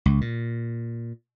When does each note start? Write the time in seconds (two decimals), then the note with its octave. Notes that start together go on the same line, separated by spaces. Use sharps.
0.06 C#2
0.21 A#2